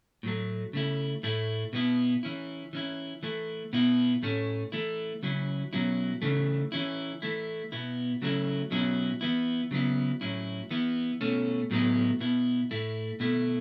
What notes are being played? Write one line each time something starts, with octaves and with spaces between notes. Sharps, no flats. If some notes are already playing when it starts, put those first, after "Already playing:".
A2 F#3 A3
C#3 A3 E4
A2 A3 E4
B2 B3 E4
E3 C#4 E4
E3 C#4 E4
E3 A3 E4
B2 B3 E4
A2 A3 C#4
E3 A3 E4
C#3 F#3 C#4 E4
B2 F#3 C#4 E4
C#3 E3 A3
E3 C#4 E4
E3 A3 E4
B2 B3 E4
C#3 F#3 A3 C#4 E4
B2 F#3 C#4 E4
E3 B3 E4
C#3 F#3 B3 E4
A2 F#3 C#4 E4
E3 B3 E4
B2 A3 C#4
A2 F#3 B3 E4
B2 B3 E4
A2 A3 E4
B2 A3 E4